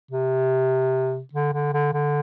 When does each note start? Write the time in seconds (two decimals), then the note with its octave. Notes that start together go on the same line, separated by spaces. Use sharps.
0.11 C3
1.33 D3
1.54 D3
1.73 D3
1.93 D3